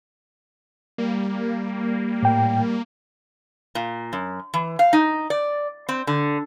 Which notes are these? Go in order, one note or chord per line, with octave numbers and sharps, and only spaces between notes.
G3 A#3
A2 G5
A#2
F#2
E3
F5
D#4
D5
C4
D3